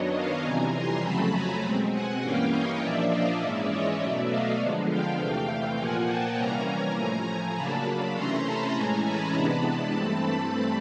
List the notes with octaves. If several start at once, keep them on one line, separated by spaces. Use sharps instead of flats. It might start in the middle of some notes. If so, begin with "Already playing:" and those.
Already playing: F#2 D#3 F#3 B3 D4 C#5 D#5
D#5 F5
F2 C3 E3 G3 G#5 A#5
A#5 C6
F2 C#3 F#3 A3 A5 B5
G#5 A#5
B2 G#3 C4
F#5 G#5
G2 E3 G3 A#3 C#4 F5 G5
C#5 D#5
A#2 F3 A#3 D4 D5 E5
D#5 F5
G#2 E3 G#3 C#4 D5 E5
C#5 D#5
B2 F#3 A3 D5 E5
D#5 F5
D3 F3 G#3 B3 D4
F5 G5
E2 C3 E3 A3
A#2 F3 A#3 F#5 G#5
G5 A5
C3 E3 G3 A#3 C#4 G#5 A#5
A2 F3 A3
C#3 F#3 A#3 D4 A5 B5
C3 E3 A3 C#4 A#5 C6
A5 B5
A2 E3 G#3 C#4 G#5 A#5
A5 B5
C3 E3 G#3 B3 D4
G2 E3 A3 C4